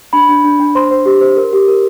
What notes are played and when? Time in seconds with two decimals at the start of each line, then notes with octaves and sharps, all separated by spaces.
0.13 D4 B5
0.29 D4
0.44 D4
0.60 D4
0.75 C5 C6
0.91 C5
1.06 G4
1.21 C5
1.37 A#4
1.53 G4
1.68 A#4